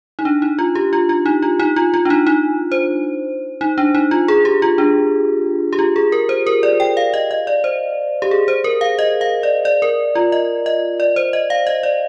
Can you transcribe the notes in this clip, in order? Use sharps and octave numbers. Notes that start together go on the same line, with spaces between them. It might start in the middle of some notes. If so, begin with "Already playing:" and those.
D#4
D4
D#4
F4
G4
F4
F4
D#4
F4
D#4
F4
F4
D4
D#4
D#4
C5
D#4
D4
D#4
F4
G#4
G4
F4
D4
G4
F4
G#4
A#4
C5
A#4
D5
G5
F5
D#5
D#5
D5
C5
G4
G#4
C5
A#4
F5
D#5
F5
D5
D5
A#4
F4
D#5
D#5
D5
C5
D#5
F5
D#5
D5